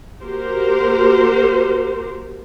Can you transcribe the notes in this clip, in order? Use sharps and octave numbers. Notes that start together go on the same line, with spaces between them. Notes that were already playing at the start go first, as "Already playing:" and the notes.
A#3 F#4 G4 A#4 C5